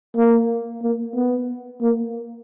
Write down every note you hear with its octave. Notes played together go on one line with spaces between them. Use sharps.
A#3
A#3
B3
A#3